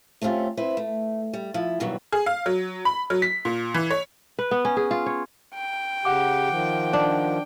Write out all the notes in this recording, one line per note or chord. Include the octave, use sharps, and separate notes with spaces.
A3 C4 C#4 F4 G4
C4 E4 B4 C5
A3
G3
F3 E4
G2 B2 D#3 E3 F#3 G3
G#4
F5
F#3
B5
F#3
B6
A#2
E3
C#5
B4
B3
C#4
G#4
F4
C#5
G5
C#3 G4 F#5 D6
D#3 F3
D4